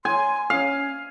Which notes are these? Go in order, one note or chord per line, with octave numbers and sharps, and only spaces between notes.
G#5 C6
C#4 F5